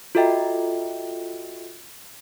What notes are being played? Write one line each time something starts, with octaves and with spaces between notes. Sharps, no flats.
F4 F#4 A4 D#5 E5 G5